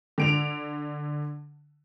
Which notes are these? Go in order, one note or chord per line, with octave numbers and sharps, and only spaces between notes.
D3 D7 F7